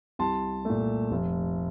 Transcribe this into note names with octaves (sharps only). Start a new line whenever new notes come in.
C2 A5 C6
A#2 A3
F1